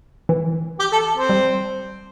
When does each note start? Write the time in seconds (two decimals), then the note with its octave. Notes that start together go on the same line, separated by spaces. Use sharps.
0.29 E3
0.79 G4
0.92 A4
1.17 C4
1.29 G3